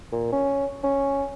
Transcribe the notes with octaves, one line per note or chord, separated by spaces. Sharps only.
A#2
C#4
C#4